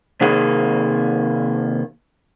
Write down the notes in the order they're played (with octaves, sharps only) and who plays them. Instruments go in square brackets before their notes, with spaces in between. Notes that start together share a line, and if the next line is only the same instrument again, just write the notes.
[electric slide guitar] C3 D#3 A#3 G#4